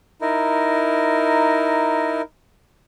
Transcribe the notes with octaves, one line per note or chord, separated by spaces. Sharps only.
D#4 E4 A#4